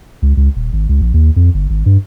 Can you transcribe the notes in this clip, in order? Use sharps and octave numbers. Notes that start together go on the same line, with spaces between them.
C#2
C#2
D#1
G#1
C#2
A#1
D#2
F2
G1
G#1
G2